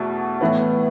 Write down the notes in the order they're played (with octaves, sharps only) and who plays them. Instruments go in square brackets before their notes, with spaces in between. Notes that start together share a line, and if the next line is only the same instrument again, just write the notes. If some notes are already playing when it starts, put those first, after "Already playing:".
Already playing: [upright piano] E2 B2 A3
A2 E3 B3